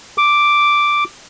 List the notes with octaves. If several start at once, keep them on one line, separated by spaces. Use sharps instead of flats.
D6